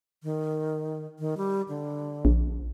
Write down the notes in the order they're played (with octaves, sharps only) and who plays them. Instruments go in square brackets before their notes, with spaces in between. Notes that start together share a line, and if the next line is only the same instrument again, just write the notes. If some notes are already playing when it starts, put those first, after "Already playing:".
[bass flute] D#3
D#3
G3
D3
[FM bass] A#1